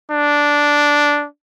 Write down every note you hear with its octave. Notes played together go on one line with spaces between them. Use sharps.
D4